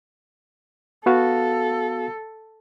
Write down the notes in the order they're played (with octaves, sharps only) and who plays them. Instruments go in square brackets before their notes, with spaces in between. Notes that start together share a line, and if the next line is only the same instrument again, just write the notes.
[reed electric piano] B3 F#4 F5 [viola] A4